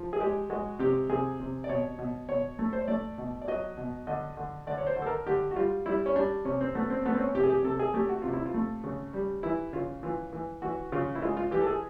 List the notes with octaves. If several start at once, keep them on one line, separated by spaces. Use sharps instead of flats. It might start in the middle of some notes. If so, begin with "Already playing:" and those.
Already playing: F3
G#4
G#3 G4
G#3 F#4
C3 G4
C3 G#4
C3
D5
B2 C#5
B2
B2 C#5
A3
C5
C#5
A3 D5
B2
D5
F#3 D#5
B2
D3 D#5
D3
D3 D5
C#5
C5
D3
A4
A#4
D3 G4
F#4
G3 F4
G3 E4
C#4
G3 D4
C3 C#4
C4
A3 B3
C4
A3 B3
C4
C#4
C3 G4
G#4
G4
C3 A4
G#4
A3 G4
F#4
C3 F4
E4
F4
A3
C#3
G3
E3 E4
C#3 F4
E3 F4
E3
E3 F#4
C#3 F4
E4
G#3 F4
F4
E3 G4
A4
G#4